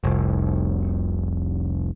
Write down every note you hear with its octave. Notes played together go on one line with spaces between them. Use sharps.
F1 C2